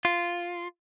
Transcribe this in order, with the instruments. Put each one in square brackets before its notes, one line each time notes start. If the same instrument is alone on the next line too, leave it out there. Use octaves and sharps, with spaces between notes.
[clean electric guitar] F4